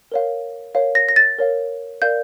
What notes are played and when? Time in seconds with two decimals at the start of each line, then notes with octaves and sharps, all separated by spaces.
0.12 A#4 C#5 F5
0.75 A#4 C#5 F5
0.95 A#6
1.09 A#6
1.16 A6
1.39 A#4 C#5 F5
2.02 A#4 D5 F5 G6